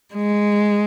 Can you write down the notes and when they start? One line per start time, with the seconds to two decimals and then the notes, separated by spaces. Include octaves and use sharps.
0.15 G#3